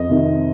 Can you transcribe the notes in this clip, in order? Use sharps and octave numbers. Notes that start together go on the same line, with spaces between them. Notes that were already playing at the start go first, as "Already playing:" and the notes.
Already playing: F2 D#5
C3 D#3